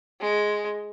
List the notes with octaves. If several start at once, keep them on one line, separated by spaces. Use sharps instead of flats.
G#3